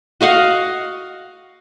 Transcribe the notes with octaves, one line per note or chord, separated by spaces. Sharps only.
F#4 D#5 F5 F#5